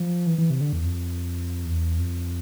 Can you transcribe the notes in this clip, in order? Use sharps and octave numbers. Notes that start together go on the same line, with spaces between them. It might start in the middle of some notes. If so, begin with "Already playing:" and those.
Already playing: F3
E3
E3
C3
D3
E2
F2
E2
F2